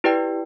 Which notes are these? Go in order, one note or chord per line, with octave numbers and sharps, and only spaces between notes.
E4 G4 B4 D5 G5